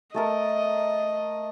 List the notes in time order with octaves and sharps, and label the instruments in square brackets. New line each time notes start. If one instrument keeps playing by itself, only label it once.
[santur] A3 A4 A#4 [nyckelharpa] D#5